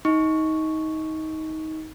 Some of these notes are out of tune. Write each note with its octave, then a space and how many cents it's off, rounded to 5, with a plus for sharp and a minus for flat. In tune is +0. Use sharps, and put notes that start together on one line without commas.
D#4 +20 C#6 +0